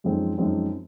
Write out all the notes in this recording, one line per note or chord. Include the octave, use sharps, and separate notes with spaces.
F#2 F3 G#3 C4 D#4
F#2 F3 G#3 C4 D#4